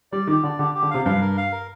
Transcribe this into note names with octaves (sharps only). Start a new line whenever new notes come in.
G3 D5
D#3 G4
D3 D5
D3 G4
G4
D3
C3 F5
G2 F5
A#4
F5
A#4